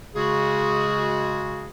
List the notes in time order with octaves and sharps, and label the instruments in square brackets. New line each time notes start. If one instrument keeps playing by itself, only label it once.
[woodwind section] C#3 G#3 F#4 G#4